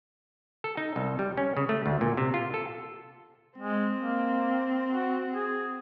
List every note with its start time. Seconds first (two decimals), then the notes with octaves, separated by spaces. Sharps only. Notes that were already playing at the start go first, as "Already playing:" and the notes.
0.64 A4
0.77 D#4
0.96 C2
1.19 G3
1.37 C#4
1.57 C#3
1.69 A3
1.86 D2
2.01 A#2
2.17 C3
2.34 F4
2.54 A4
3.58 G#3 C4
3.97 A#3
4.88 F#4
5.34 G#4